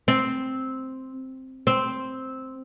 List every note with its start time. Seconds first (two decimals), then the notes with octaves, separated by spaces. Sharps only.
0.08 C4
1.67 C4